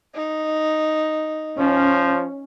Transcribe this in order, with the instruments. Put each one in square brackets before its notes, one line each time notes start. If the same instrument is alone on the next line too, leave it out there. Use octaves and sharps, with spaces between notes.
[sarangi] D#4
[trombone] F3 [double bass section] C#4